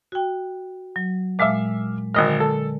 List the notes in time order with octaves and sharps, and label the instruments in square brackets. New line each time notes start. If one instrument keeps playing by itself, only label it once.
[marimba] F#4 G5
F#3
[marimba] A#2 G#3 [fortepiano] E5 F5 D6
[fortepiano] G#1 D#5 F6 [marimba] D3 G#3 A#4
[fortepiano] A4